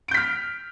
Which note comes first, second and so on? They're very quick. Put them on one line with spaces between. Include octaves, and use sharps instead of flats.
D7 G6 B6 F6